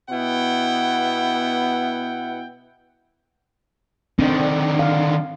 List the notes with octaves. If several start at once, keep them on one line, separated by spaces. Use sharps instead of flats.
B2 B3 E4 F#5 G5
D3 D#3 C4 D4
F5